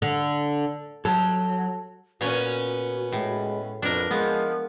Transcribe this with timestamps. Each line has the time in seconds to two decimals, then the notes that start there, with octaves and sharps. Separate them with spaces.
0.02 D3
1.05 F#3 A4
2.21 A#2 B3 C#4 F#4 C#5
3.12 A2 G#3
3.82 F2 B2 D4 A#4
4.11 F3 G#3 B3 A#4